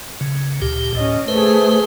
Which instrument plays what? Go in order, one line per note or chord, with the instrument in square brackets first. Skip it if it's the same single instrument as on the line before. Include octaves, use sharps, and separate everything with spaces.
[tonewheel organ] C#3
D2 A#2 G4
[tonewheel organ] A2 [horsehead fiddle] C#4 D#5
[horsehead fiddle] A3 G#4 [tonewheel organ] B4 C5